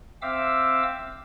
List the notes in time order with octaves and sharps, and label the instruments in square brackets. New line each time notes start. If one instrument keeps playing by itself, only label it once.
[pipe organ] C4 E5 F5 D6 E6